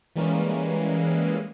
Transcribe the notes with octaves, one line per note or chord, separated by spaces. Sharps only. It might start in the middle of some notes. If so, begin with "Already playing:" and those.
E3 G3 G#3 A#3 C#4